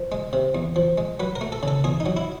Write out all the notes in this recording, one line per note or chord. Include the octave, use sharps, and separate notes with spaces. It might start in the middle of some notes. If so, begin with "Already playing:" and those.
Already playing: F3
G#3
C3
E2
F3
G#3
F#3 B4
A#4
A3
A4
C#3 A4
E2 G#4
D#4
F#3
E4